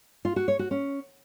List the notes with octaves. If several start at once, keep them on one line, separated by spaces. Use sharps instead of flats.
F4
F#4
C#5
F#4
C#4